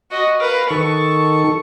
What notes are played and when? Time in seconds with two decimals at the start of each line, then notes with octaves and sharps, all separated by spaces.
0.11 F#4 D#5
0.40 A#4 B4 F5
0.71 D#3 A4 C#6